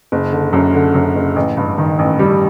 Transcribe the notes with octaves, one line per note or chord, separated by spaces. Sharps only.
F#1
D3
F#2
D3
F#2
F#1
A1
G2
D#3
A1
G3